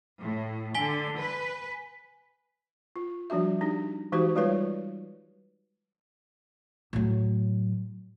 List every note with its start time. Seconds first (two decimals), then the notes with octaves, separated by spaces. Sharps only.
0.21 A2
0.75 D3 G#5 B6 G7
1.19 B4
2.96 F4
3.30 F3 G3 D4 F#4 E5
3.61 D4 D#4 G4
4.12 E3 G#3 D#4 F#4 G4 C5
4.36 G3 G#3 F4 B4 C#5
6.93 A2 F#3